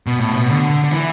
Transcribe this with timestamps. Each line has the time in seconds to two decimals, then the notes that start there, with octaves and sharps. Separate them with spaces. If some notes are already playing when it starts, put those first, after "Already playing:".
0.07 B2
0.19 A2
0.32 B2
0.50 D3
0.84 D3
0.92 E3